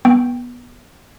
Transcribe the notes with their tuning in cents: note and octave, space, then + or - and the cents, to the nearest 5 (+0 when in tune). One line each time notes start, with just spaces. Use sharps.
B3 -15 G5 +0